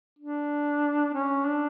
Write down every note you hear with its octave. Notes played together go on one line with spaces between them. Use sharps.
D4
C#4
D4